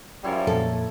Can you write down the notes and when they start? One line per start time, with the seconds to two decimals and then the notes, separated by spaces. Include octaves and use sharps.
0.24 F#2 F3 G3 E4 C#5
0.47 F2 A#2 A4